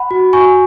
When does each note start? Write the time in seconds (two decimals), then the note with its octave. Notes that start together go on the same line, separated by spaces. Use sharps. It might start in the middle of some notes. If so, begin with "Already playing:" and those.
Already playing: F#5 B5
0.11 F#4
0.33 F#4 G#5 C#6